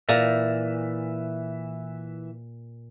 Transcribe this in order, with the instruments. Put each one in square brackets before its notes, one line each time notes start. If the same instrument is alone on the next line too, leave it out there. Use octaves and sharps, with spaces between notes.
[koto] A#2 A#5 [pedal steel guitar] E3 E5